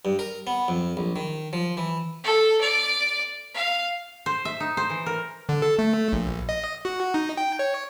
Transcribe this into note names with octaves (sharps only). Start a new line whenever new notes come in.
G2
A#4
B3
F2
A#1
D#3
F3
E3
A4
D5
F5
C5
E5
D#4
C5
E3
A#4
D3
A4
A3
A#1
D#5
F#4
D#4
G5
C#5